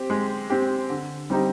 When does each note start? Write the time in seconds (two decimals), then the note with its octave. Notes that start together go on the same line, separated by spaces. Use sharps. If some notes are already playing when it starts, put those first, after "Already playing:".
Already playing: C4 G4
0.10 G#3
0.50 C4 G4
0.90 D3
1.30 G3 C4 D#4 G4